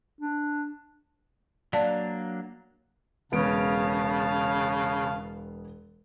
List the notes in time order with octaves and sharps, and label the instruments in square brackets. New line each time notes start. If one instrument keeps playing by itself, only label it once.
[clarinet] D4
[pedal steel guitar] F#3 A#3 D4 [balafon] D5 F5 A5
[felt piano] E1 B3 D7 [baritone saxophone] C#3 [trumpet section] F5 A5